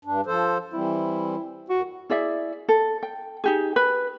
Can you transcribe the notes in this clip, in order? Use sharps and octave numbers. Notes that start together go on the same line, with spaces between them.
G2 D4
F3 A4 C5
E3 G3 C4 E4
F#2 F#4
E4 G#4 D5 E5
A4
G5
D#4 G4 G#4
B4